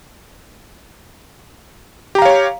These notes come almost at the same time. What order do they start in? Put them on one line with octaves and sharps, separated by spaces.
G4 A#5 F5 C#5